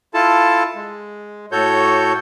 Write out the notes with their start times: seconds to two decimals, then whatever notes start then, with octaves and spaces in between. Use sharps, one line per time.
0.14 E4 F4 A4 A5
0.75 G#3
1.52 A2 F#4 A4 C#5 G6